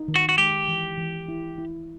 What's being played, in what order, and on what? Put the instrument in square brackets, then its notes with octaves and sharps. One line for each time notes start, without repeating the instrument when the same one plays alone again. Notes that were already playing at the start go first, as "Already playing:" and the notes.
Already playing: [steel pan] D#4
D#3
[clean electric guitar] F#4
F#4
[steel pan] G#3 [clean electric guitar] G4
[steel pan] E3
E3
E4
E4